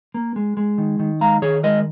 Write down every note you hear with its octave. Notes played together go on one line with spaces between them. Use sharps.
A#3
G#3
G#3
D#3
D#3
G#3 F5 A#5
D#3 G#4 C#5
G#3 A#4 D#5